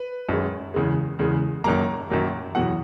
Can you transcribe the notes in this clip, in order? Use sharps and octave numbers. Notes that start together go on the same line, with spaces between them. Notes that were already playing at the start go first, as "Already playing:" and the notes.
Already playing: B4
F#2 D#3 G#3
E2 C#3 G#3
E2 C#3 G#3
F#2 D#3 F#3 A#3 A#5
F#2 D#3 F#3 A#3
E2 B2 F#3 F#5